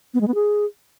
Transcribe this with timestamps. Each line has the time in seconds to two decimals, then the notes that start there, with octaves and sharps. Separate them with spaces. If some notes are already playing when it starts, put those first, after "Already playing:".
0.14 B3
0.21 G#3
0.28 B3
0.34 G#4